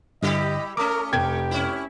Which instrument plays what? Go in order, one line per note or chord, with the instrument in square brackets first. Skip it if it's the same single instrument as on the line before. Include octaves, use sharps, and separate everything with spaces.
[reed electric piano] G2 D3 [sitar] G3 E4 G4 [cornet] D#5
[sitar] A3 C#4 [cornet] A#4 [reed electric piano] D6 D#6
[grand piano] F1 G5 G#6 [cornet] G4
[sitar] C#4 E4